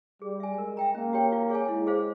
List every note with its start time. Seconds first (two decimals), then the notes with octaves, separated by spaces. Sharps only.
0.21 G3 G#4
0.40 E5 G#5
0.57 G#3 A#4
0.77 E5 G5 A#5
0.95 A#3 C#4
1.13 G4 C#5 G5
1.32 F4
1.50 G#4 C#5 F5 G#5
1.69 G#3 E4
1.87 G#4 C5 F5